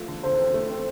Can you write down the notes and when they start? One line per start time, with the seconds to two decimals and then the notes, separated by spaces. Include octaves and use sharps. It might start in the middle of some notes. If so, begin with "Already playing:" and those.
Already playing: F3 A3
0.08 D3
0.23 D3 C5
0.39 C4
0.54 A3
0.69 C4